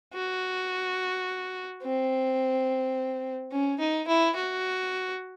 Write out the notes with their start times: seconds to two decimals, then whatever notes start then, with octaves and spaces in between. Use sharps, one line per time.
0.14 F#4
1.82 C4
3.52 C#4
3.79 D#4
4.08 E4
4.36 F#4